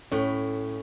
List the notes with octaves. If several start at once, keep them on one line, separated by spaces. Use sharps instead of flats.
A2 C#4